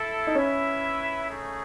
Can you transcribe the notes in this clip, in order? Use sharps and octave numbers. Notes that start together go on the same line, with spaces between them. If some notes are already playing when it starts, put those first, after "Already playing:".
Already playing: E4 A4 E5
D#4
C#4 E4 B4 E5
A3 D#4 G#4